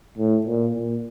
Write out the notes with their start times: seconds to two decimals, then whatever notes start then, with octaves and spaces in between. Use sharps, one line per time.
0.18 A2
0.46 A#2
0.75 A#2